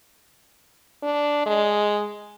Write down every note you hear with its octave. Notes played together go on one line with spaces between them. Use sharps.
D4
G#3